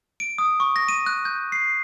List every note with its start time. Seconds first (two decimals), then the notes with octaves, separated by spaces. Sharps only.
0.20 D7
0.38 D#6
0.60 C#6
0.76 A#6
0.89 D#7
1.06 F#6
1.25 G6
1.52 C7